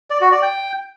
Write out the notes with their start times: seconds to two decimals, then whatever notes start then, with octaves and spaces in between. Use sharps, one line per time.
0.10 D5
0.21 F#4
0.32 D5
0.42 G5